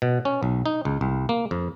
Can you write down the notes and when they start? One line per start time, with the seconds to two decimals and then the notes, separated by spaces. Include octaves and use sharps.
0.02 B2
0.25 C#4
0.43 B1
0.66 D#4
0.85 C#2
1.01 C2
1.29 A#3
1.51 F2